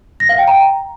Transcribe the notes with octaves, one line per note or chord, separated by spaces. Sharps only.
A#6
F5
G5
A#5